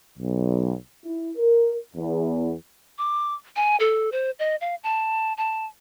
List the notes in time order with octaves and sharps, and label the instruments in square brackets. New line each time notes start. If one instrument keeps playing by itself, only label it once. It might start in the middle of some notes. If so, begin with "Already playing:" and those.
[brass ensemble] B1
E4
A#4
E2
[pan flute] D6
G#5
A4
C5
D#5
F5
A5
A5